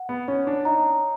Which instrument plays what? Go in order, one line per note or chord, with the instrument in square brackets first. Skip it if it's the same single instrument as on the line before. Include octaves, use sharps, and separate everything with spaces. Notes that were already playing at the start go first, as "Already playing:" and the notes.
Already playing: [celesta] F#5
[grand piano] B3
[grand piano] C#4 [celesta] C#5
[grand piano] D4
[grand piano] D#4 [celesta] A#5